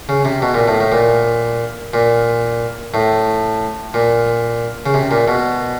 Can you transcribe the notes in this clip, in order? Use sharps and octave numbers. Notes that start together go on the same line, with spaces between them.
C#3
C3
B2
A#2
A2
A2
A#2
A#2
A2
A#2
C#3
C3
A#2
B2